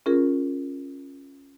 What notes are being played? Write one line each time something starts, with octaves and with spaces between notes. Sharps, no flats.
C#4 F4 G#4 A#4